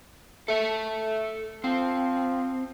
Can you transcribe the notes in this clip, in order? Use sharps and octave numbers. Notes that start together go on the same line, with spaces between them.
A3 A4 E5
F3 C4